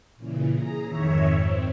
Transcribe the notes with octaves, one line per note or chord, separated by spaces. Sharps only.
A#2 C#3 E3
G#4 A#5
F2 G#2 D#3 C#5 E5
C4